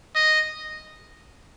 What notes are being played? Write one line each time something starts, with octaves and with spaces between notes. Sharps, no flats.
D#5